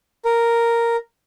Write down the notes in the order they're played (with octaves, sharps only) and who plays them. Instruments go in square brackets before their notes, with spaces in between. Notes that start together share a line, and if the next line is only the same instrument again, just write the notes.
[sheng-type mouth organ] A#4